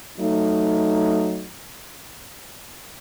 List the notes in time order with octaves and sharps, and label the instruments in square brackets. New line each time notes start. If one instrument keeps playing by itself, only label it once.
[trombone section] F#3 A3 D#4